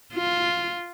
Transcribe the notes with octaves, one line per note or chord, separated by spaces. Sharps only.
F4